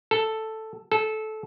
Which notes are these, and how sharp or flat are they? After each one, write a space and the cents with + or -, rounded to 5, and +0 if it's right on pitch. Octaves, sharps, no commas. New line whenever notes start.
A4 +0
A4 -20